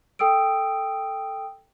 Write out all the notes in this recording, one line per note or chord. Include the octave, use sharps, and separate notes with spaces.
A4 G5 D#6 E6 D7